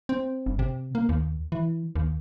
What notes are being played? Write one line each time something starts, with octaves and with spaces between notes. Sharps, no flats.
C4
G1
C3
A#3
D#2
E3
D#2